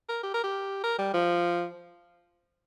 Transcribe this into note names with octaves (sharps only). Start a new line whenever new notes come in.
A#4
G4
A#4
G4
A#4
G3
F3